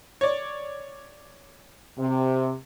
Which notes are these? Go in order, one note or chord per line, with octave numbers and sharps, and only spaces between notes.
C#5 D5
C3